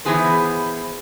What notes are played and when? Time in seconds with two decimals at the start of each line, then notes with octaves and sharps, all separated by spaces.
0.05 E3 F#3 B3 G#4 B4 C5